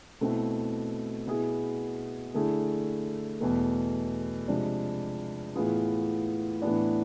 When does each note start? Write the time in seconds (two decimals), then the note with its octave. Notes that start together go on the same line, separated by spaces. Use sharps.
0.21 B2 A3 C4 E4
1.27 B2 B3 E4 G#4
2.34 D3 A3 E4 G#4
3.41 E2 B2 A3
4.48 C3 F3 G#3 D4
5.55 A2 E3 B3 F4 G#4
6.62 A2 E3 B3 D4